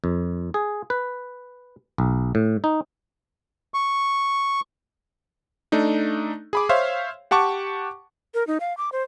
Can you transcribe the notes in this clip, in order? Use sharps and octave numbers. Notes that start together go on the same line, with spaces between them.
F2
G#4
B4
B1
A2
D#4
C#6
A3 D4 D#4
G#4 B5 D6
C5 C#5 E5 F5
G4 F#5 A5 C#6 D6
A#4
D#4
F5
D6
C5